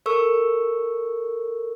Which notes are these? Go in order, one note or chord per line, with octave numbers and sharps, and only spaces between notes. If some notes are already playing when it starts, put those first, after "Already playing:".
A4 A#4 C#6 E6